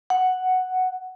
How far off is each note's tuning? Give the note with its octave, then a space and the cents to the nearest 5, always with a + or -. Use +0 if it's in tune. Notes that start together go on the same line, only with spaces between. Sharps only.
F#5 +0